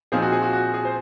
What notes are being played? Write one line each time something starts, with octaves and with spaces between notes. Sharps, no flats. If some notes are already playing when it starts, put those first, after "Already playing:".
A#2 F3 C4 D#4 G#4
F#4
G#4
F#4
F#4
G#4
C5